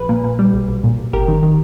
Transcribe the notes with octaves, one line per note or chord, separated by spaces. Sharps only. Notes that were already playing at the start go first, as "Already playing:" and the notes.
Already playing: A#1 B4
A#2
A#2
G3
B1
B1
A#2
B1
G1 G4 A#4
D#3
D#3